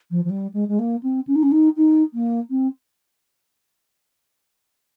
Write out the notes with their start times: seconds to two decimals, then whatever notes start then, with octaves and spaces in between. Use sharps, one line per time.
0.11 F3
0.24 F3
0.30 G3
0.53 G#3
0.68 G#3
0.79 A#3
1.03 C4
1.27 C#4
1.35 D#4
1.43 C#4
1.51 D#4
1.77 D#4
2.14 A#3
2.50 C4